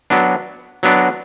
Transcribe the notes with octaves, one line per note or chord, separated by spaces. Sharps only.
F#3 B3 D4
F#3 B3 D4